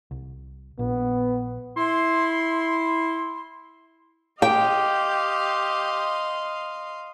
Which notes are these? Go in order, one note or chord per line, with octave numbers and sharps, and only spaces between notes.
C2
A#1 B3
E4 C6
G4 D#5 F5 G5 C6